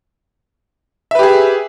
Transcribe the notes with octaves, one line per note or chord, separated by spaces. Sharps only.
G4 G#4 B4 E5